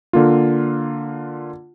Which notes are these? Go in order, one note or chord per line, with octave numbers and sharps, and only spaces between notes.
D3 A#3 F4